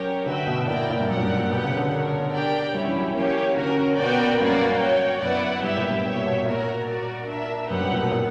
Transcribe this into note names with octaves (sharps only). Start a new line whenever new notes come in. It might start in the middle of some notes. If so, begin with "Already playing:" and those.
Already playing: F#3 C#4 G4 A#4 C#5
D3 F#4 B4 E5 G5
B2
A#2 E4 A#4 D5 G5
A#2
G2
F#2 G4 A#4 D5 F#5
A#2
G2
A#2
B2 G4 B4 F#5
C#3
D3
D4 A#4 C#5
D4 G4 A#4 D5 G5
G3 C#4 E4 G4 C#5
E3
F#3
E3 A#3 C#4 G4 C#5
D3 C#4 F#4 A#4
B2 B3 F#4 A#4 D5 G5
A#2
G2 A#3 C#4 F#4 B4 D5
F#2
G2
F#4 C#5 G5
F#2 B3 E4 B4 D5 F#5
G2 B3 E4 G4 B4 E5
A#2
G2
G2 G4 C#5 E5
A#2
B2
B2
A#2 F#4 A#4 C#5
F#4 A#4 D5
D4 A#4 E5
F#2 G4 B4 F#5
G2
A#2
B2
A#2